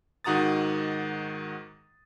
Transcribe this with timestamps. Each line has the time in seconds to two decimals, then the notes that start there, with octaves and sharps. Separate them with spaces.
0.24 G#2 D#3 F#4 A#5 D#6 A6